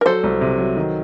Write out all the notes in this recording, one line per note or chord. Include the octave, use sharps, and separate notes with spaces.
A#4
F#3 A4 C5
C2
C3
F#3
D#3